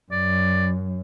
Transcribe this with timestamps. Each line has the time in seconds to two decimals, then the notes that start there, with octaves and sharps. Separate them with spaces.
0.12 F#2 D5